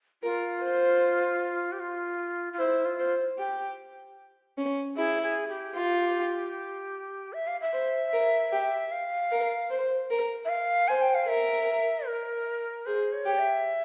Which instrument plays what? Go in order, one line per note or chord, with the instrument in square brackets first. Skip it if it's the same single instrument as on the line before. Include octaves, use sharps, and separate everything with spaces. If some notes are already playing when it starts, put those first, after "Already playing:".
[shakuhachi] F4 [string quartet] A#4
[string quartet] C5
[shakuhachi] G4
F4
F4
[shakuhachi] E4 [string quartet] C5
[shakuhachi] F4
[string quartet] C5
G4
C#4
[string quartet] E4 [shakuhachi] G#4
[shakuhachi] G#4
G4
[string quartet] F4
[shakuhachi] E5
F5
E5
[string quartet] C5
A#4
G4
[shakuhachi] F5
[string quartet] A#4
C5
A#4
[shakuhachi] E5
F5
[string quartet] C5 [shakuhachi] G#5
[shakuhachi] G5
F5
[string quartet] A#4 [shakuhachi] E5
[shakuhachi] A#4
[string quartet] G#4 [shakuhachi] C5
[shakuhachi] C#5
[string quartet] G4
[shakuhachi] E5